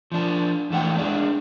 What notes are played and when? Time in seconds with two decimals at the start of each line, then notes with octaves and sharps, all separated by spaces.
0.12 F3 D4
0.70 E2 E3 A3 F#5 G5
0.98 G#3 D4 G#4 D5